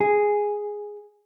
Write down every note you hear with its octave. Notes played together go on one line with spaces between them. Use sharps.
G#4